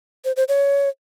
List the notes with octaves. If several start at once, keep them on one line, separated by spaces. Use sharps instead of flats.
C5
C5
C#5